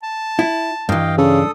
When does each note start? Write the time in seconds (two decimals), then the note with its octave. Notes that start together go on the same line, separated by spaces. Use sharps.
0.03 A5
0.39 E4
0.89 G2 E3 D#5 F5 G5
1.18 C#3 D4 A4 D#6